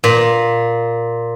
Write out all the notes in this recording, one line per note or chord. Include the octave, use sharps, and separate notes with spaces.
A#2